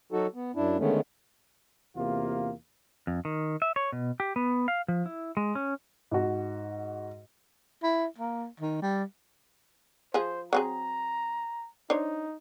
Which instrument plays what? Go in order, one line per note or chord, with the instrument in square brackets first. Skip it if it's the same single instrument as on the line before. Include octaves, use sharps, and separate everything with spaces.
[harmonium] F#3 D#4 F#4 A4
B3
F#2 D4 E4
D3 D#3 G#3 A3 B3 C#4
[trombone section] E2 C3 A#3 F4
[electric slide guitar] F2
D#3
E5
C#5
B2
G4
B3
F5
F3
E4
G#3
C#4
[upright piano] G#2 F#4
[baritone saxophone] E4
A#3
D#3
G3
[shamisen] F3 G#4 [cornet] C5
[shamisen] F#3 C4 G#4 [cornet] A#5
[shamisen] D4 C5 C#5 [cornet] D#4